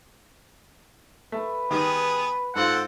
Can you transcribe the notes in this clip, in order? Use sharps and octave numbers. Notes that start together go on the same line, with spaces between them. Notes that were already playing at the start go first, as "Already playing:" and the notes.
A3 B4
D#3 G3 B3 G#4
G#2 C4 F4 A4 F#5